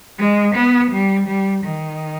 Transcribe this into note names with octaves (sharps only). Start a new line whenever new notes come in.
G#3
B3
G3
G3
D#3